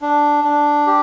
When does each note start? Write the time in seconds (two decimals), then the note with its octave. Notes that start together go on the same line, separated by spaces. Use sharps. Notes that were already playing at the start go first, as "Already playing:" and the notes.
0.02 D4
0.44 D4
0.87 G4